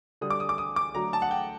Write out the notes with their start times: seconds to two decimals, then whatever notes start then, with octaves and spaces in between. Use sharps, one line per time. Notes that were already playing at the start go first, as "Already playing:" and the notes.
0.21 D3 G3 D#6
0.30 D6
0.40 D#6
0.49 D6
0.58 D#6
0.76 D6
0.95 D3 F#3 A3 A#5
1.13 A5
1.22 F#5
1.31 G5